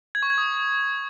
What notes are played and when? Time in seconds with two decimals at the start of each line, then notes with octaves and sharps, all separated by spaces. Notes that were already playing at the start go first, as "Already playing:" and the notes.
0.15 G#6
0.23 C#6
0.30 G#6
0.38 D#6